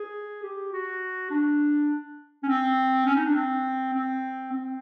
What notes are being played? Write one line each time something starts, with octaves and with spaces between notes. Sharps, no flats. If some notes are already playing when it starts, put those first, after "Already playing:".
Already playing: G#4
G4
F#4
D4
C#4
C4
C#4
D#4
D4
C4
C4
C4